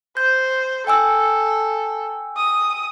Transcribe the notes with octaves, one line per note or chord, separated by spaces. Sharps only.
C5 G6
A4 G5 G#5 E6
D#6